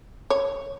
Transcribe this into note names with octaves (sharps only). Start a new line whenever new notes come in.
C#5